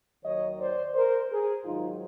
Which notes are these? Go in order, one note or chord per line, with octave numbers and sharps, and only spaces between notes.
D#2 D#3 F#3 C#5 D#5
C5 D5
A#4 C5
G#4 A#4
G#2 D#3 F#3 D#4 F4